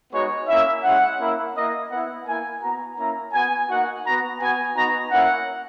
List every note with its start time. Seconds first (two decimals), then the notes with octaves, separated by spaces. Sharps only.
0.12 G#3 B3 D#4 F#4 C#5
0.48 A#3 C#4 E4 E5
0.83 G#3 C#4 E4 F#5
1.20 A#3 C#4 E4
1.55 A#3 E4 D#5
1.90 B3 E4 F#5
2.27 A#3 E4 G#5
2.62 B3 F#4 A#5
2.98 A#3 C#4 E4 A#5
3.33 B3 F#4 G#5
3.68 A#3 D#4 F#4 F#5
4.04 B3 F#4 A#5
4.41 B3 F#4 G#5
4.76 B3 D#4 F#4 A#5
5.11 A#3 C#4 E4 F#5